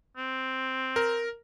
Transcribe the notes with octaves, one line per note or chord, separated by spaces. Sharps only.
C4
A#4